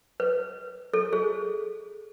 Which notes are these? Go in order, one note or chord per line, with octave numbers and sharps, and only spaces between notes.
B4
A4
G#4